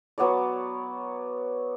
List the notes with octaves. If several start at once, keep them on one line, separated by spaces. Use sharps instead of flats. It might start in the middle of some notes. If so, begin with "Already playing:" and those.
F#3 B3 C#5 D5